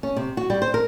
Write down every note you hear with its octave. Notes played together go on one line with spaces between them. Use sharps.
C#4
C3
F#4
G3
C5
A#4